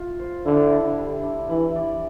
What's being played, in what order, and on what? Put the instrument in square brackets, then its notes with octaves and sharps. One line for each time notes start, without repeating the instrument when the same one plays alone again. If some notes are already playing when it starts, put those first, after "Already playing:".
Already playing: [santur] F4
C5
[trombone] D3 [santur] E4
[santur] E4
G3
D4
[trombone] E3 [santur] E4
[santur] D5